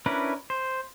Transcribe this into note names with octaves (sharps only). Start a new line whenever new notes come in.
C#4 D4 E4 A#4 B4
C5